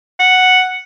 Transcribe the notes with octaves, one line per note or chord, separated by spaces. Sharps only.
F#5